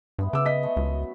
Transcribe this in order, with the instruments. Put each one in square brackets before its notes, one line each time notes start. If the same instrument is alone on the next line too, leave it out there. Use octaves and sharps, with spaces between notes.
[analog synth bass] G2 [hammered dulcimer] G#3 B3 E4
[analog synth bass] C#3 [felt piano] D6 E6
[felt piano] D#5 B6
[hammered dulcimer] G#3 A3 A4
[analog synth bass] C#2 [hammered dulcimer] F#2